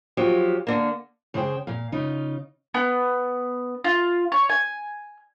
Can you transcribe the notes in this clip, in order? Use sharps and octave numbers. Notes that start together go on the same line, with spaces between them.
F3 F#3 G4
D3 A#3
C#3 G#4 C5 F#5 G5
A#2 F5
C#3 D#4 F4
B3
F4
C#5
G#5